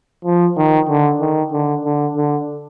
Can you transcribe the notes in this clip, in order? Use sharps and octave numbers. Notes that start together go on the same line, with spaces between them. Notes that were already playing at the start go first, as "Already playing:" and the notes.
F3
D#3
D3
D#3
D3
D3
D3